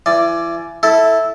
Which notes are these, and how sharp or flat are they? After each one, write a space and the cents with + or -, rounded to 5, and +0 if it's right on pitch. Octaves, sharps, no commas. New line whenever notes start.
E3 +30 D5 +0
E4 -10 A4 +0